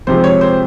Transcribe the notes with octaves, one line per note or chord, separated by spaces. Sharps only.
F2 C3 F3 G#3 C5
C#5
C5